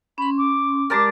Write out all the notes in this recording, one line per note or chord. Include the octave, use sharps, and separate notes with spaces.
C#4 B5 C6
D6
G#3 G4 A#4 D5 A5 C6